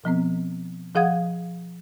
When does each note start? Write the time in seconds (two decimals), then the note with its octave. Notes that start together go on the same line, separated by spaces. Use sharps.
0.04 B2 F3 B3 C4
0.95 F3 G#4 F5 F#5 D#6 G#6